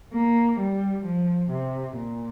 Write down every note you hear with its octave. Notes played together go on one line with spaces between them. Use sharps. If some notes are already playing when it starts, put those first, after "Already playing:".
A#3
G3
F3
C3
A#2